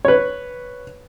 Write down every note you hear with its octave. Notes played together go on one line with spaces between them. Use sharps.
B4 C#5